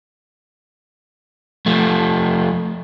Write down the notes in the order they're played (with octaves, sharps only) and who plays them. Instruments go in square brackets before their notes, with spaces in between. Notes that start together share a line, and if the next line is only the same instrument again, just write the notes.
[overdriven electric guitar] F3 A3